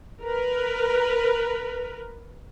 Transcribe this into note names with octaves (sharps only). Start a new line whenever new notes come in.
A#4 B4